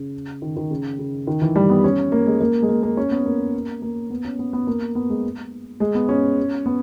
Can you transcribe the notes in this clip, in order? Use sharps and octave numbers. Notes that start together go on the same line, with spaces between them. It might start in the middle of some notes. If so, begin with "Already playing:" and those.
Already playing: C#3
D#3
D#3
C#3
C#3
D#3
E3
G3
B3
C#4
A#3
G#3
A#3
G#3
A#3
A#3
C#4
B3
A#3
A#3
B3
C#4
B3
B3
A#3
B3
G#3
G#3
B3
C#4
B3